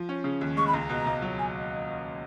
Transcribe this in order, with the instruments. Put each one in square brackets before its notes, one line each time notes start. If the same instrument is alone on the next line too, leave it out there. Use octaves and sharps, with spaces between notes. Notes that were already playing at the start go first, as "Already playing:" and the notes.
Already playing: [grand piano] F3
C#4
C#3
D#2
[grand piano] G#3 [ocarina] C#6
[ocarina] B5
[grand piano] C#2 [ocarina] A#5
[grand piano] B2
C#2
F#3
[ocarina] G#5